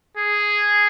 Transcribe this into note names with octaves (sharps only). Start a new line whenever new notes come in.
G#4